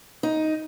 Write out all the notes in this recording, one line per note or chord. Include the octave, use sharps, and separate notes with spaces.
D#4